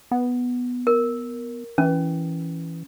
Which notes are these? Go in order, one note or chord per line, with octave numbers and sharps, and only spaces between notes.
B3
A#4
E3 C#4